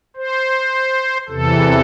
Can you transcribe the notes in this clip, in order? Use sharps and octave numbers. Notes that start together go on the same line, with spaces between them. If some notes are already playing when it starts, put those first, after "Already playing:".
C5
E2 C3 E3 A4